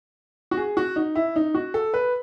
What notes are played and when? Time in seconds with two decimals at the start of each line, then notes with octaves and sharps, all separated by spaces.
0.51 F#4
0.57 G#4
0.77 F#4
0.96 D#4
1.15 E4
1.36 D#4
1.54 F#4
1.74 A4
1.94 B4